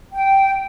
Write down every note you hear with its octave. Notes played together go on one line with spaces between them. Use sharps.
G5